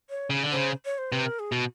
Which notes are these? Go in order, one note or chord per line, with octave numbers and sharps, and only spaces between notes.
C#5
C#3
D3
C#3 C5
C#5
C5
C3 B4
A#4
G#4
B2 F#4